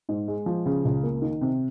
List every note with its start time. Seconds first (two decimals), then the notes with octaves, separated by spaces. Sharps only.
0.09 G#2
0.28 G#3
0.46 F3
0.66 C#3
0.85 C#2
1.03 A#3
1.22 D#3
1.41 C3